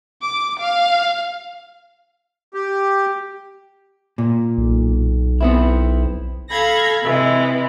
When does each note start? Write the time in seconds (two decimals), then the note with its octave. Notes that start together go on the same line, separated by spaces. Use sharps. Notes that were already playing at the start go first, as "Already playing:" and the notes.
0.22 D6
0.60 F5
2.54 G4
4.18 A#2
4.58 B1
5.41 B3 C4 E4
6.50 A4 F5 B5 G#6 A#6
7.03 C3 E3 G#3